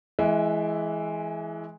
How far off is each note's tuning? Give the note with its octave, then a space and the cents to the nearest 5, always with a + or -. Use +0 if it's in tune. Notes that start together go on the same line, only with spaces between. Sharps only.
E3 +0 G#3 +20 E5 +0